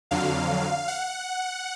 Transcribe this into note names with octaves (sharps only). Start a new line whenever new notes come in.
F2 D3 F#3 F5
F#5